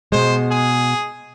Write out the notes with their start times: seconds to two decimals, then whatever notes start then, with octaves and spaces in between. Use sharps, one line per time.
0.12 B2 G#3 C5
0.51 G#4